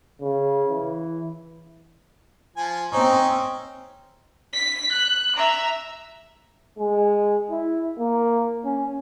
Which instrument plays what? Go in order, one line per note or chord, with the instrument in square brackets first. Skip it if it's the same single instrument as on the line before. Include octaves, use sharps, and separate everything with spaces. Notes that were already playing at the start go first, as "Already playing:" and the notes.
[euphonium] C#3
E3
[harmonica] F3 G#5
[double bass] C4 [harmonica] C#4 D#4 C#6
[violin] B6
F#6
E5 A#5
[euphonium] G#3
E4
A#3
C#4